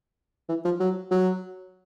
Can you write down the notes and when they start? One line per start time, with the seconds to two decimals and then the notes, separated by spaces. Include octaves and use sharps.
0.49 E3
0.65 F3
0.80 F#3
1.11 F#3